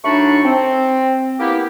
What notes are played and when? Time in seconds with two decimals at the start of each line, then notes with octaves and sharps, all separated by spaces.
0.04 F#2 A3 D4 D#4 B5 C#6
0.45 C4
1.39 A#3 B3 E4 G4